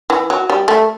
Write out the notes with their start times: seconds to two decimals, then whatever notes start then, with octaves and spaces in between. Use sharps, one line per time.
0.10 E3
0.30 F#3
0.50 G3
0.68 A3